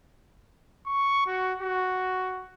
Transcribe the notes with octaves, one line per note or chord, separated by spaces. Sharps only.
C#6
F#4
F#4